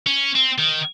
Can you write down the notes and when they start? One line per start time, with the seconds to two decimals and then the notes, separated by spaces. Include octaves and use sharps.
0.07 C#4
0.36 C4
0.59 D#3